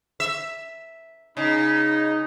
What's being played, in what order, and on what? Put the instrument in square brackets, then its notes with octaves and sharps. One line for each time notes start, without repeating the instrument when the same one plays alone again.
[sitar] E5
[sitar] C#3 [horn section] D#4